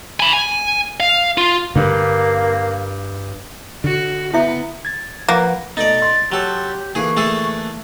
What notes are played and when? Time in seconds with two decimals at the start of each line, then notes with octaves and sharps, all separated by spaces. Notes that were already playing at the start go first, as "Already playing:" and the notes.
0.20 G#5 B5
0.33 G#5
1.00 F5
1.38 F4
1.76 G2 D3 A#3
3.84 D3 F#4
4.34 B3 E4 E5
4.85 G#6 A6
5.28 F3 A#3 B4 F#5
5.77 B2 A3 D#4 D5 A6
6.02 C6
6.32 F#3 G4 A4
6.95 D3 E3 A#3 G#4 C#6
7.17 A3 G#4 A4